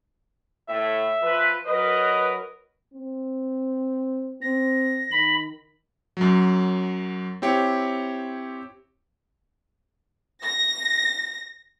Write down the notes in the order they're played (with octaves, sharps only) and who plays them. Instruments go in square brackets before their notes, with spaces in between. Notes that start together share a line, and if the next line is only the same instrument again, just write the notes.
[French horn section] A2 [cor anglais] E5
[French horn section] F3 F4 B4
[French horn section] F#3 A#4 B4 [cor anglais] D#5
[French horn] C4
[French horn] C4 [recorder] A#6
[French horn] D#3 [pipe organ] B5
[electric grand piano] F#2 F#3
C4 E4 G4 C#5
[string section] A#6